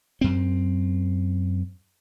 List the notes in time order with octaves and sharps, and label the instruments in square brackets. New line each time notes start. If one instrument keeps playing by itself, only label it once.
[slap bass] F#2 C4